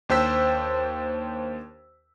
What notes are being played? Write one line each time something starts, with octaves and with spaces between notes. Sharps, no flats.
D#2 D4 C5 G5 E6 B6